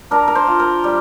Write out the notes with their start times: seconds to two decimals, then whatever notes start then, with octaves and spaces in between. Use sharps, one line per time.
0.11 D4 A#4
0.28 A#4
0.35 C5
0.47 F4
0.60 A#4
0.84 G3